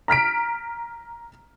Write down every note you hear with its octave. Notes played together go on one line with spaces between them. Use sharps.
A#5 F6 B6 D7